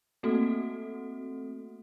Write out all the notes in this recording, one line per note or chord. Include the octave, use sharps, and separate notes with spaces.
A3 A#3 C4 F#4 A4